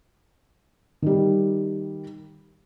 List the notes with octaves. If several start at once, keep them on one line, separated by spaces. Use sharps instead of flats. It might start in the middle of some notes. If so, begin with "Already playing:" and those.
D#3 G3